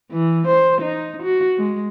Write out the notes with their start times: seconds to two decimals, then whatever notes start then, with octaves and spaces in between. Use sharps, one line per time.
0.12 E3
0.47 C5
0.81 D#4
1.22 F#4
1.57 G#3